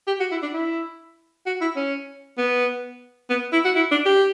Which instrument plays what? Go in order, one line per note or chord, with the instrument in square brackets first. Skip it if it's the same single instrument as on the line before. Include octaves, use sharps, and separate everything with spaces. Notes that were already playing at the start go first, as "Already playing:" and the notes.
[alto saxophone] G4
F#4
E4
D4
E4
F#4
E4
C#4
B3
B3
E4
F#4
E4
D4
G4